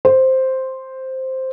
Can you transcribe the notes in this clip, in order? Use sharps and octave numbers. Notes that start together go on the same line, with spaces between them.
C5